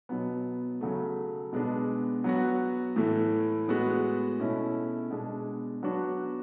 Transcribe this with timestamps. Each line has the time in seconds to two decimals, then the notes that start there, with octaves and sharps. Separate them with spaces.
0.09 B2 F#3 B3
0.81 C#3 F#3 A3
1.53 B2 G#3 B3 D4
2.24 F#3 B3 F#4
2.96 A2 E3 A3
3.68 A2 G#3 B3 F#4
4.39 B2 A3 C#4 E4
5.11 B2 G#3 D4
5.83 F#3 B3 D4 F#4